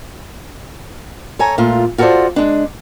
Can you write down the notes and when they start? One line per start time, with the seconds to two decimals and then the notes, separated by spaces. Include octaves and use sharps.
1.39 A4 C#5 G#5 A#5
1.58 A#2 A3 F4
1.98 F4 F#4 A4 B4 C5 D5
2.36 G#3 D4